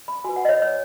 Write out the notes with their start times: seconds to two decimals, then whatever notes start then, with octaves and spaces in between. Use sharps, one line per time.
0.08 B5
0.24 F#4 B4 G#5
0.36 F#5
0.45 D#5
0.49 C#5
0.62 C#5